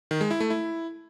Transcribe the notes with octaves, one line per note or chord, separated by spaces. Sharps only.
D#3
G#3
E4
A3
E4